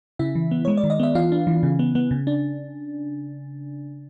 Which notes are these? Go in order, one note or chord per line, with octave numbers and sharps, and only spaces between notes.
C#3 E4 E5
E3
B3
G#3 C#5
D5
D#3
D#5
B3 E5
E3 F4 F5
D4
E3
C#3
B3
B3
C#3
D4